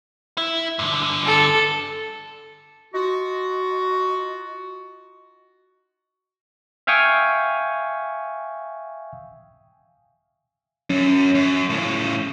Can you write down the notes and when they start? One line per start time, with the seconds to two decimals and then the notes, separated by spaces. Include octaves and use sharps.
0.38 E4
0.79 G2 D3
1.25 A4
2.94 D#4 F4 F#4
6.87 E5 F5 G5 G#5 C#6 D#6
10.90 F#2 C#4
11.35 F#2
11.70 A2 C#3